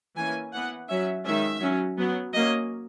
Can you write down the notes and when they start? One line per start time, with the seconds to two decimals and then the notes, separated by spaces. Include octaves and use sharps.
0.16 E3 A#3 C#4 G#5
0.52 E3 B3 F#5
0.89 F#3 C#4 E5
1.25 D#3 G#3 C#4 E5
1.61 F#3 C#4
1.98 F#3 B3
2.33 F#3 A#3 C#4 D#5